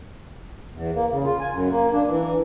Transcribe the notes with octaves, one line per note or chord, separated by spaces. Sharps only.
E2
A#3
C#3
F4
G#5
F#2
A#3
D4
E3